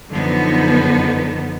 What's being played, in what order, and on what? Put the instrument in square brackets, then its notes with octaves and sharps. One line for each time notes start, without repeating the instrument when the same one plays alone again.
[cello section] F#2 D3 F3 B3 D#4